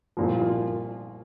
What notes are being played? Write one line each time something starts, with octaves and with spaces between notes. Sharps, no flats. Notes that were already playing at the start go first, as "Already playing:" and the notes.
C2 A#2 F3
F4